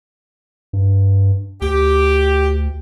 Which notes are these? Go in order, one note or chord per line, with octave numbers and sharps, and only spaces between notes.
G2
D2 G4